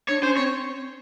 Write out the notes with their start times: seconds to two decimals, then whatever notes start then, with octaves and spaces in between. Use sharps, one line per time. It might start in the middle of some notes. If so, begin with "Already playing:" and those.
0.08 D4 C#5
0.22 C#4 C5
0.37 C4 C#5